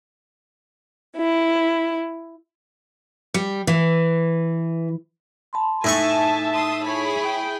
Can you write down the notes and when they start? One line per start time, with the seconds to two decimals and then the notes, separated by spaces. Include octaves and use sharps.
1.16 E4
3.34 G3
3.67 E3
5.53 A5 B5 C6
5.84 A2 A3 D#4 E5 G#5 A5 C#6
6.53 C6 D#6
6.85 E4 G#4 C#5 B5
7.24 G5